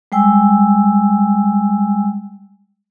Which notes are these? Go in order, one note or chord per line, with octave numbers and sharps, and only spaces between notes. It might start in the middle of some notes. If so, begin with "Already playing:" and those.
G3 G#3 G5 G#5 E6